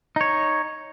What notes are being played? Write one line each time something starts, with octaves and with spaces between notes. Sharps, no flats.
D#4 C#5